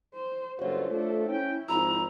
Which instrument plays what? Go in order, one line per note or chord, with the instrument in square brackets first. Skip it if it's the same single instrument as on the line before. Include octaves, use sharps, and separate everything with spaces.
[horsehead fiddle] C5
[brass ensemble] F#1 G2 F4 [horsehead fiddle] F#4 A4 [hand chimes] C5 C#5
[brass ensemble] A3 F4 [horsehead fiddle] D4 A4
[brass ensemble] C#4 G5 [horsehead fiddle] E4
[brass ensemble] G#1 F3 [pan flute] A#5 [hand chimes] B5 E6